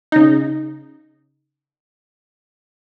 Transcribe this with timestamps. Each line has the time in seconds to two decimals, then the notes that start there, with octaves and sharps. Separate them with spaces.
0.12 C#3 D#4